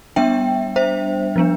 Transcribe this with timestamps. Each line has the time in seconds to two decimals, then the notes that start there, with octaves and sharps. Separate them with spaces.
0.16 G3 B3 D4 E5 G5
0.76 C5 E5
1.36 F3 B3 D4